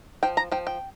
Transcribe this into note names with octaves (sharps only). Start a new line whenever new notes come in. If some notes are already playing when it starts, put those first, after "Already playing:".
F3 G5
A#5
F3 G5
G5